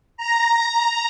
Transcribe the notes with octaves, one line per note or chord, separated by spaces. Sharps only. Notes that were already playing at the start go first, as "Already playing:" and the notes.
A#5